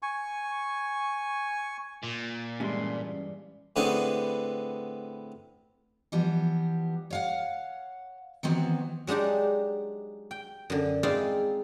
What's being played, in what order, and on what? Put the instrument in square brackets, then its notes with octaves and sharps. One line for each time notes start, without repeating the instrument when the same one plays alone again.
[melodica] G#5 C#6
[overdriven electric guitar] A#2
[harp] G2 E3 G#3 [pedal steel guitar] C#4 C6
[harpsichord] A2 D3 B3 C4 G#4
[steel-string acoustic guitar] E3 F3 G3 B3
C#5 F5 F#5
D#3 E3 F#3 B3 C4 F#4
[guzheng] F#3 G#3 D4 D#4 G4
G5
F#2 D3
G#3 C4 D#4 E4 D5 F5